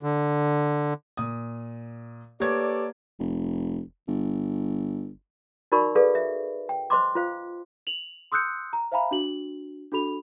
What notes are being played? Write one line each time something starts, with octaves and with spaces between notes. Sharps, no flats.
D3
A#2 D#6
A#3 G4 A4 B4 C#5 D5 G#6
F1
G1
D#4 F#4 A#4 D5 B5 C#6
G#4 A4 B4 D5 F5
E5
G5
C5 D#5 C6 D6
F4 C5 F5
F7 F#7
C6 D#6 E6 F#6 G6 C#7
A#5
C5 E5 F5 G#5 A#5 B5
D4 F#4 F#7
D4 F#4 A4 B5 F7